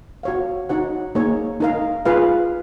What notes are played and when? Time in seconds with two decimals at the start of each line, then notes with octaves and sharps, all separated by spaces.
0.23 F#4 C#5 F5
0.69 D#4 F#4 C#5 F#5
1.15 A#3 D#4 G#4 C#5
1.60 D#4 A#4 F5
2.05 F4 G#4 B4 F5